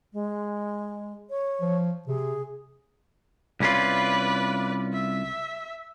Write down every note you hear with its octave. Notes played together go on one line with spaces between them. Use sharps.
G#3
C#5
F3
C3 G#4
C2 C#4 F4 B4 D5
E5